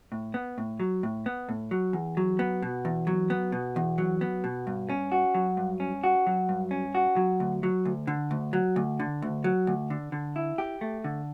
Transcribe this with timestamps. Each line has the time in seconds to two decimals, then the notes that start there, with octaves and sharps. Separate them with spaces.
0.12 A2
0.34 B3
0.58 A2
0.80 F#3
1.03 A2
1.26 B3
1.49 A2
1.71 F#3
1.93 E2
2.17 F#3
2.39 B3
2.63 B2
2.85 E2
3.07 F#3
3.30 B3
3.52 B2
3.76 E2
3.98 F#3
4.21 B3
4.44 B2
4.67 G2
4.90 C#4
5.12 F#4
5.35 F#3
5.57 G2
5.80 C#4
6.04 F#4
6.27 F#3
6.49 G2
6.71 C#4
6.95 F#4
7.16 F#3
7.40 D2
7.63 F#3
7.85 D2
8.07 D3
8.31 D2
8.53 F#3
8.76 D2
9.00 D3
9.22 D2
9.44 F#3
9.67 D2
9.90 D3
10.12 D3
10.36 E4
10.58 G4
10.81 A3
11.04 D3